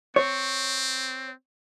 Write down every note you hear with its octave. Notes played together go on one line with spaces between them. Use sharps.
C4 C#5